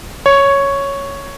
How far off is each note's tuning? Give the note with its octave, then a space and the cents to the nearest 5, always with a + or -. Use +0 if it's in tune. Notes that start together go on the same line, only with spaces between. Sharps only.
C#5 +0